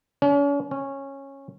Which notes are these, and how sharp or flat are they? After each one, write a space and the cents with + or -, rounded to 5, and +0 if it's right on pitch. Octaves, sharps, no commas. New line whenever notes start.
C#4 +40
C#4 -15